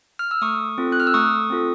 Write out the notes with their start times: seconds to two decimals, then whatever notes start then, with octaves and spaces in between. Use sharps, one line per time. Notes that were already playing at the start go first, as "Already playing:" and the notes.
0.19 F6
0.31 E6
0.42 A3 C#6 D#6
0.78 C4 F4 A4
0.92 F#6
1.00 F6
1.07 E6
1.14 A3 C#6 D#6
1.50 C4 F4 A4